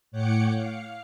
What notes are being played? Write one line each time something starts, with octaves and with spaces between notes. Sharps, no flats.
A2 C#5 F#5 G5 D6 C#7
F5